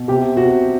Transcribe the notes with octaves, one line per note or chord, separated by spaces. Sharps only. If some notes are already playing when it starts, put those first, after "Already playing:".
Already playing: B2
C3 G4
C3 F#4